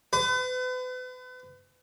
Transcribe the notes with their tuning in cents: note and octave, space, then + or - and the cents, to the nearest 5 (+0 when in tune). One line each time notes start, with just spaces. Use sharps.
B4 +40